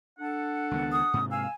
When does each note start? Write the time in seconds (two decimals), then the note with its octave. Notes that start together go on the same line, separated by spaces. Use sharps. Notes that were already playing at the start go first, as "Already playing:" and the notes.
0.19 D4 A4 F#5
0.71 C#2 D#3 B3
0.92 D#6
1.13 G#2 C3
1.31 F5 G#5 E6